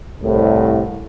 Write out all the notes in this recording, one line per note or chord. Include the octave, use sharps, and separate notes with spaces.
C2 A2